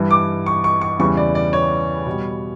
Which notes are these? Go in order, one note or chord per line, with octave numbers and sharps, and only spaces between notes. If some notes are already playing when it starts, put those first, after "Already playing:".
Already playing: G2 E3 G3
D6
C#6
C#6
C#6
E2 C#3 E3 G3 C#6
D5
D5
C#5
B2 G3